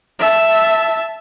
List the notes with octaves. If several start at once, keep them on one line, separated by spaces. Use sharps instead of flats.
E5 A5